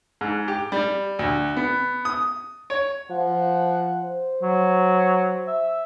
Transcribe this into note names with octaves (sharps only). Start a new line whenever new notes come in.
G#2
G4
G3
D2
B3
D#6
C#5
F3 F#5
C5
F#3
E5